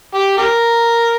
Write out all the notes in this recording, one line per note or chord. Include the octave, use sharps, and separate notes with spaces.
G4
G4 A#4